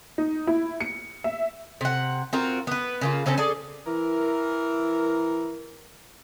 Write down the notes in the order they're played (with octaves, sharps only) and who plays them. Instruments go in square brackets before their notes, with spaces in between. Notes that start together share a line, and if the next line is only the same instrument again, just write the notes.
[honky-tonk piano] D#4
E4
C#7
E5
[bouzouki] C3 F#5
C4 F4 F#4 A#4
B3 B4
C#3 A#3 F4
C#3 C4 C#4 A4
G#4 A4 D5
[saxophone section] E3 A#4